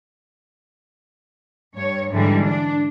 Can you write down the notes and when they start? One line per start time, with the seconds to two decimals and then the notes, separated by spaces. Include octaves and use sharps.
1.76 G2 C#5
2.12 G#2 D3 E3 G3
2.45 D4